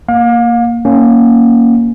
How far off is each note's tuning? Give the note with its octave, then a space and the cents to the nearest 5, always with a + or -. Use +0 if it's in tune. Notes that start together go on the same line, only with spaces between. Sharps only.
A#3 -5 F5 +35
A#3 +0 C#4 +0